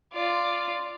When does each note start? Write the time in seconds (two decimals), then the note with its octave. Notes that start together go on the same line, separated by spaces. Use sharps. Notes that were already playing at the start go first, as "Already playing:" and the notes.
0.13 F4 D5